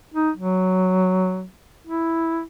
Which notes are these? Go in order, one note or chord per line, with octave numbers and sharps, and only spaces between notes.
D#4
F#3
E4